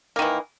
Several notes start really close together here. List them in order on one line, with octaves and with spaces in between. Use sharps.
A#3 D#3 E3